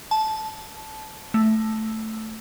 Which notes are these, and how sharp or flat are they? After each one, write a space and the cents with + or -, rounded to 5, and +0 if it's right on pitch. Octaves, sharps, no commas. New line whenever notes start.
A5 -15
A3 +0